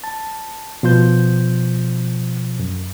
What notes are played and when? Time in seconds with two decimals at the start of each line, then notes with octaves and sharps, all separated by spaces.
0.04 A5
0.83 B2 F3 C5 G6
2.59 F#2